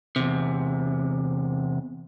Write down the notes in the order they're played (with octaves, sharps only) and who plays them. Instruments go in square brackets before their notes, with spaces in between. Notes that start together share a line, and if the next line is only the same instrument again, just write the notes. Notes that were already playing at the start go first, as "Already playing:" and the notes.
[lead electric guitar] E2 C3